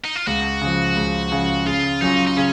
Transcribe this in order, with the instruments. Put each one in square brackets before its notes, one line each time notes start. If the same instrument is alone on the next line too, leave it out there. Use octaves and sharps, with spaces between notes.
[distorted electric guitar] D#4
F4
[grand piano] C#2 [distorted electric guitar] F#4
[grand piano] C#3 F3
C#2
C#3 F3
[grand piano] C#3 [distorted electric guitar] F4
[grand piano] F#3 C#4 F4 [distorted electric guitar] D#4
[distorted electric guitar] D#4
[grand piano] C#3 [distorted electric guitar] C#4